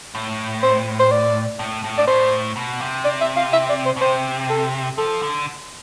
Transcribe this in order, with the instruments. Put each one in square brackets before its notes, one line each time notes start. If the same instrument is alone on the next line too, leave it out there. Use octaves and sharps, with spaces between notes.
[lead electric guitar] A2
[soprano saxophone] C5
C5
D5
[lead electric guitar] A2
A2
[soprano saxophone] D5
[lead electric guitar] A2 [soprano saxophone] C5
[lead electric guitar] B2
C3
[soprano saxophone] D5
E5
F5
E5
D5
C5
[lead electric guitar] B2
[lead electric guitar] C3 [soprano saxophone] C5
[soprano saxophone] A4
[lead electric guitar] F3 [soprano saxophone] A4
[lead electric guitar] D3